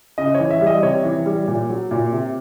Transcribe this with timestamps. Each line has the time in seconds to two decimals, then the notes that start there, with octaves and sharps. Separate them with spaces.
0.18 C#3 D#5
0.34 C#5
0.40 E3
0.50 E5
0.61 G3
0.67 D#5
0.83 C3 C#5
1.04 E3
1.26 G3
1.47 A#2
1.69 F#3
1.91 A#2
2.12 C3